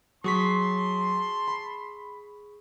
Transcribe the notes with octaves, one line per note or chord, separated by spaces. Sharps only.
F#3 G#4 A5 C6 C#6 B6
B5